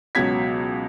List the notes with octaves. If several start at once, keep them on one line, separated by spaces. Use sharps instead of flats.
C#2 B2 F#3 G#6 B6